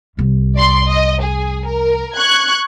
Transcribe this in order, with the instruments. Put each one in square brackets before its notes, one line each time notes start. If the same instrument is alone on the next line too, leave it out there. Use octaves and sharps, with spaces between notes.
[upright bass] C2 F2
[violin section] D5 C6
D#5
G#4
A#4
C#6 F#6 G#6